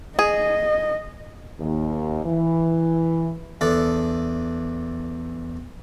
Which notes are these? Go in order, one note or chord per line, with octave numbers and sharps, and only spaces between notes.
G#4 D#5
D#2
E3
E2 D4 A4